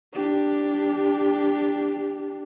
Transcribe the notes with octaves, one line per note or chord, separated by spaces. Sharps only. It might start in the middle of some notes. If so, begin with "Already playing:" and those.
D4 G4